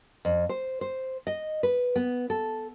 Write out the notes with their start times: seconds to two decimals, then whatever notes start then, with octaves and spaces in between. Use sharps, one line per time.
0.25 F2
0.49 C5
0.81 C5
1.27 D#5
1.63 B4
1.96 B3
2.30 A4